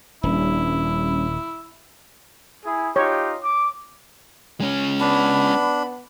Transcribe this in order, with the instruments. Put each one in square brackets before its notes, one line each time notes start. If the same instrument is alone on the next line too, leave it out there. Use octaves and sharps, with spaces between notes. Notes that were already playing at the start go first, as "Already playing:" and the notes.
[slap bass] D#1 [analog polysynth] G3 C#4 D4 [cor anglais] E4
[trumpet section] E4 G#4
[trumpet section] D#4 F4 G4 [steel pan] C#5
[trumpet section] D6
[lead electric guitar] G#3 C#4
[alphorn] B3 [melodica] D4 [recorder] B5